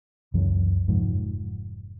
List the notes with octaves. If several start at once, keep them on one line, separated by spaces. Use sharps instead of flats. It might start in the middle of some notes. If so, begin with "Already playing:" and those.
C#2 F#2 C#3 E3
F1 G#2 F3